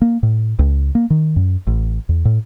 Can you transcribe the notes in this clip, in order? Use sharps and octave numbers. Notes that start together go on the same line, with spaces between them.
A#3
A2
C#2
A#3
D#3
F#2
A1
E2
A2